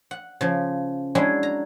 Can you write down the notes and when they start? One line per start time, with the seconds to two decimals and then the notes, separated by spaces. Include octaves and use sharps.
0.11 F#5
0.41 C#3 F3
1.15 F#3 G#3 C#4 D4 E4 G#4
1.43 A#5